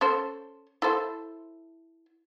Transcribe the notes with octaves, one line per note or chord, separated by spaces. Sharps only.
C#4 A4 C5
E4 A4 C5